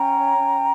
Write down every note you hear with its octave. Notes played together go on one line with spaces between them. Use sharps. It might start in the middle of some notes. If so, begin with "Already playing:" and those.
Already playing: C#4 G5 A#5
C#5
C#4